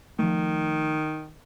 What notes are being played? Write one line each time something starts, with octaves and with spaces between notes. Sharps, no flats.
D#3 F3 A3